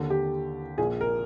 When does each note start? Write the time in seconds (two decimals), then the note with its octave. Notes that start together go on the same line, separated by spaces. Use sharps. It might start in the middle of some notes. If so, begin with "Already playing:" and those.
Already playing: D#2 D3
0.10 G4
0.78 A#1 A#2 G#4
1.01 A#4